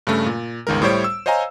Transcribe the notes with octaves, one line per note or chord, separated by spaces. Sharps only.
G2 C#3 A3
A#2
G1 C#2 D#3 G#3 A#4
A2 G3 C5 C#5 D7
E6
C5 C#5 D#5 F5 G#5 A#5